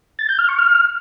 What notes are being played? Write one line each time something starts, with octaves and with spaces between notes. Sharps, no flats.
A6
G6
F6
C#6
F6